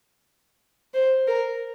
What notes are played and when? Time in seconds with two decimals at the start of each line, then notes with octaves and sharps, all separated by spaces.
0.94 C5
1.27 A#4